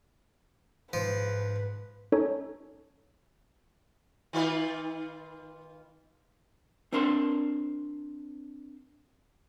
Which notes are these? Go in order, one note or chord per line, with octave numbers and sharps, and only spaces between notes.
G#2 F3 B4
C#4 D#4 A4 C#5
D#3 F4 B4
C4 D4 A#4 C5 A5 C6